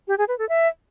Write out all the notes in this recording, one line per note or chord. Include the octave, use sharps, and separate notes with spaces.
G4
G#4
B4
A4
E5